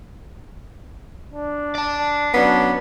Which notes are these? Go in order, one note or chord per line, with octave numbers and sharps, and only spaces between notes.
D4
D5 A5
F#3 B3 C#4 D4